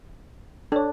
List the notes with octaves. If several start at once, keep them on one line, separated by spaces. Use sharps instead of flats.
D4 A4 C#5